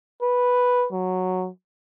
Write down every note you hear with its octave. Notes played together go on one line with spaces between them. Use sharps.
B4
F#3